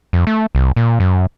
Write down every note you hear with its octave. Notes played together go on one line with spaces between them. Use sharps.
F2
A3
C2
A#2
F#2